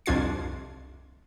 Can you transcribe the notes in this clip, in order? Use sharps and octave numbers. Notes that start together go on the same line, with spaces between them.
C2 F2 D4 F4 G#6 C7